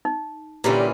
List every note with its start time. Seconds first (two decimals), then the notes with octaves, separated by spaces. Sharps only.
0.05 D#4
0.64 A#2 D3 E3 G3 C#4 G4 A#5